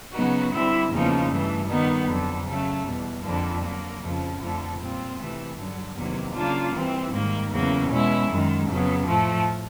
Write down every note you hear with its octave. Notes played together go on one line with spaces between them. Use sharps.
C#3 F#3 B3 D#4 F#4
D3 G3 C4 E4
E2 C#3 F3 A#3 D#4
G2 E3 A3
D#3 G3 B3 D#4
F2 D3 F#3
C#3 F#3 A3
E2 B2 G3
F2 D3 F3 A#3 D4
D3 F#3 A#3
F2 C#3 F3
F2 D3 F3 A3
A#2 G3 C4 F4
C3 E3 A3
G2 D3 F#3
E2 C3 D#3 F#3 A#3
C#3 F#3 A#3 D4 F4
E3 G3 C4
G#2 D#3 G3 A#3
E2 C#3 F#3 A#3
B2 G#3 C#4 E4
F#2 D#3 G#3
F2 C#3 F#3 B3
A2 F3 A3